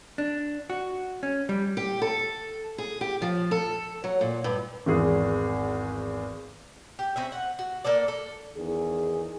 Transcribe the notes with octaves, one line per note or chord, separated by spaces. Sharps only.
D4
F#4
C#4
G3
G4
A4
G#4
G4
F3
A4
F#3
A#2
G2
G#1 E2 G#4
G4
C4 C#4 E5
F#5
F#4
A#3 D4 A4 D5
A4
E2 D#3 G#4